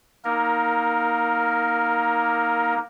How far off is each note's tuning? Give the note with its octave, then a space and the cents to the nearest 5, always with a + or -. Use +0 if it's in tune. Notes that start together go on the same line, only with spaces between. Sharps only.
A#3 +20 D#4 +20 A#4 +0